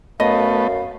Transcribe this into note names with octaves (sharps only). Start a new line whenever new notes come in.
F#2 A3 B3 D#5 F5